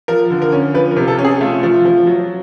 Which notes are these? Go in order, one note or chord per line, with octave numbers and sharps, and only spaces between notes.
F3 A#4
D3
A#4
C#4
F3 B4
A#4
C3
A4
C#4
G#4
A3 F4
F3
F3
F#3